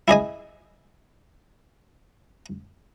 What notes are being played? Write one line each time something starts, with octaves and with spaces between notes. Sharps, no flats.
E4 G#4 D#5 G#5